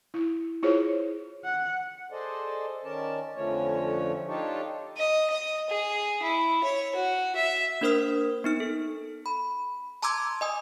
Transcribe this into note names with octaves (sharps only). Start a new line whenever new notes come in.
E4
E4 F4 G#4 C5 C#5
F#5
G#4 A4 C5 D5 D#5
D#3 C#4 A#4 D5 A5
F2 D3 F3 A3 C#4 C#5
D4 D#4 F4 G4 A4 C#5
D#5
D#5
G#4
E4
C#5
F#4
E5
A#3 D4 A#4 C5 D#6 F6
B3 D#4 F6
A4
B5
A5 A#5 C6 D6 E6 G#6
D#5 G#5 D#6